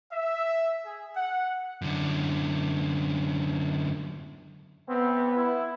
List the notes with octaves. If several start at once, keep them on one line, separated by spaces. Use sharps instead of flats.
E5
G#4
F#5
F#2 D3
B3 C4
E4